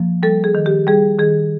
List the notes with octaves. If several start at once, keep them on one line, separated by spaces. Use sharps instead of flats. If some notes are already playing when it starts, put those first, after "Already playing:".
Already playing: F3 A#3
G3 A4
G#4
D#3
G4
G3 G#4
D#3 G#4